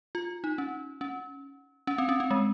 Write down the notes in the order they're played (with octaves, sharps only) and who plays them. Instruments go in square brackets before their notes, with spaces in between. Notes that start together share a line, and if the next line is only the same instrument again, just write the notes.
[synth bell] F4
D#4
C#4
C#4
C#4
C4
C#4
C4
G#3